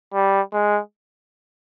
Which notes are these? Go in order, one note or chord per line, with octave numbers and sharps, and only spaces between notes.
G3
G#3